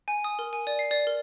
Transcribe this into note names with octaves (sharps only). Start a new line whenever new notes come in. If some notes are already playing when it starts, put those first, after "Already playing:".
G#5
D#6
A#4
G#5
D5
C7
D5
A#4